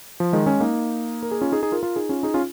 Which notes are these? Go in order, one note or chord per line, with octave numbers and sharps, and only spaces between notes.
F3
D#3 G#3
G#3 C#4
A#3 D#4
A#4
G#4
C#4 F4
D#4 G#4
D#4 G#4
F4 A#4
F4 A#4
D#4 G#4
C#4 F4
D#4 G#4
C#4 F4